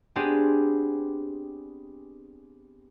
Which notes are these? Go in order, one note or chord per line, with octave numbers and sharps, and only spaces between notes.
B3 C4 D4 G4 G#4